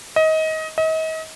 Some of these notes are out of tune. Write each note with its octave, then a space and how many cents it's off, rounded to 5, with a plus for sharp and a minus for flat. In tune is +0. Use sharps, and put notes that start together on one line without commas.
D#5 +25
D#5 +40